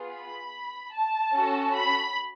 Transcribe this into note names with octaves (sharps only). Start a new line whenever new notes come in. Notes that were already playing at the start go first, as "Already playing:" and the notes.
Already playing: B3 F4 G#4
B5
A5
C#4 F#4 A4
B5